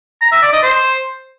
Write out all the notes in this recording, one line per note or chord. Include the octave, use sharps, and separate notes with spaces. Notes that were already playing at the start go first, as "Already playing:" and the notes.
A#5
E5
D5
D#5
C5